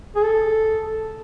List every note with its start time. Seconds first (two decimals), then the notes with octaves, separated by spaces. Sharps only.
0.15 G#4
0.24 A4